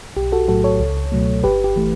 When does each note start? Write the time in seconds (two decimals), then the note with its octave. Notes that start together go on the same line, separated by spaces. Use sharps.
0.17 B1 G4
0.32 F#4 A4
0.48 A2 F#3 A3 F#4 A4
0.64 A4 C#5
0.80 C#2
1.12 B2 F#3 A3
1.43 G1 G4 B4
1.64 G4
1.76 E3 A3